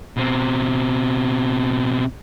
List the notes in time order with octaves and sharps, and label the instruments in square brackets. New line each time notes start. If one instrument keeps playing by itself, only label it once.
[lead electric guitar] B2 C4